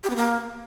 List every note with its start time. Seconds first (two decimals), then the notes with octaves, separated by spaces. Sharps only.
0.03 G4
0.10 B3
0.16 A#3